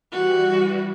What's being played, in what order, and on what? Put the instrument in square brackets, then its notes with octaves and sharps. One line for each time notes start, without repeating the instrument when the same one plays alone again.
[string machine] E3 G3 [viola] F#4